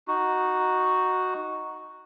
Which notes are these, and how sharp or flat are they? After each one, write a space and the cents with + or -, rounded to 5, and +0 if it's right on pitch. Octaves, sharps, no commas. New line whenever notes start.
D#4 +0 F#4 +0